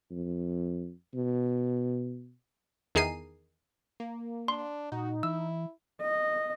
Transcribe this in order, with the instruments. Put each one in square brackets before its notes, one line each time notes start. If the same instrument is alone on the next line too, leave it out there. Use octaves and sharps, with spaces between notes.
[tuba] F2
B2
[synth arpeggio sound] E2 D#3 G#4 A#5 C7 D#7
[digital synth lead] A#3
[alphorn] D4 [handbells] C6
[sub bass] A#2 [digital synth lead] D#4 [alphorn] F#4
[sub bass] E3 [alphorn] E4 [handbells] E6
[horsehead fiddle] D#5